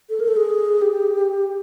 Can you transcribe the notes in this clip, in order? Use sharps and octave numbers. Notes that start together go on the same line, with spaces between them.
A4
A#4
A4
G#4
G4